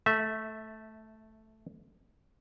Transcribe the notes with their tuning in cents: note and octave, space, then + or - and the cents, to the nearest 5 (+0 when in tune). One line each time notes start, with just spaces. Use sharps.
A3 +0 E5 -20